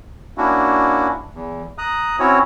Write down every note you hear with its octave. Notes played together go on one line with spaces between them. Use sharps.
A#3 C#4 D4 E4 F#4
E2
A#5 D#6 F#6
C4 C#4 E4 F#4 C#5